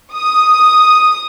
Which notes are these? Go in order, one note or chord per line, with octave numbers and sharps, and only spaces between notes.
D#6